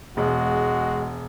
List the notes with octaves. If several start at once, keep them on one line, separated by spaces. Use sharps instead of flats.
E1 G#3 F#4